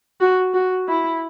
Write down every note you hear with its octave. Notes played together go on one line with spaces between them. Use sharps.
F#4
F#4
E4